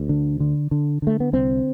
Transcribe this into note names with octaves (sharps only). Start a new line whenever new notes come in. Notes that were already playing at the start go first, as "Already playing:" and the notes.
Already playing: D2
D3
D3
D3
D3 A3
B3
C2 C4